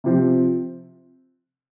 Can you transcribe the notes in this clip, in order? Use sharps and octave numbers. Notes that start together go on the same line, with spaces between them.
C3 F3 C4